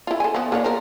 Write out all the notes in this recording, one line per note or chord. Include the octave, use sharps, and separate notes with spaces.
E4 F4
A4 G#5
F3 B3
A#3 D4 C#5
F3 A#4